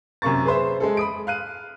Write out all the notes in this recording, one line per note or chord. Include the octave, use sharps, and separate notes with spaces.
F#2 C3 A#3 C#6 A6
G#4 B4 C5 E5
G#3 G#4 A4
B5 D#6 D7
F5 F#6 D#7